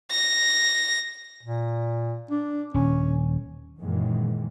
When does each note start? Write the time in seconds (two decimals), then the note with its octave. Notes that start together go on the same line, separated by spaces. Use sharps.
0.11 A#6
1.43 A#2
2.31 D4
2.74 D#1 C#4
3.82 F#2 A#2 D#3 E3 G#3